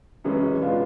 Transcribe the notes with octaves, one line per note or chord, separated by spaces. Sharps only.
F#2 C#3 E3 G#3 C#4
B2 G#3 B3 D4 F4